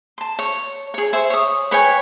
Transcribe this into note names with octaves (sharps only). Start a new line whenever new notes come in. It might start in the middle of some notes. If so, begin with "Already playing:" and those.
A5 C6
C#5
G#4 C#5
G#4 C5 E5
C#5 D#6
B4 C#5 G5 G#5